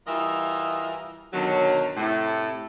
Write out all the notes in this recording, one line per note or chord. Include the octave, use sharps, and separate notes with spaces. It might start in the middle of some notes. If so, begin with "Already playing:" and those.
E3 G3 F4 A#4 D#5 E5
B2 D3 D#3 F#3
A2 C3 E4